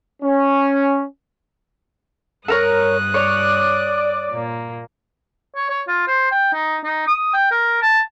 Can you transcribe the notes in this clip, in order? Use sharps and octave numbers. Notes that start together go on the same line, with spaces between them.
C#4
G2 A4 A#4 C#5 D#6 F#6
C#5 D5
A#2 A#3
C#5
C#5
F4
C5
G5
D#4
D#4
D#6
G5
A#4
A5